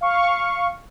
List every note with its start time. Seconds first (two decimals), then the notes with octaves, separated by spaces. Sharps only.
0.01 F5 C#6